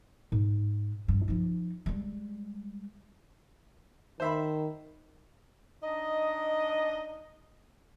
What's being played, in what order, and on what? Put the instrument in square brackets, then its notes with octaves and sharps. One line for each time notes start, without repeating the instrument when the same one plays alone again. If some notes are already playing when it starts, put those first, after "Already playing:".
[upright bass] G#2
G2
F3 D#4
G3 G#3
[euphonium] D#3 [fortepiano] C5 E5 B5
[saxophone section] D4 D#4 D#5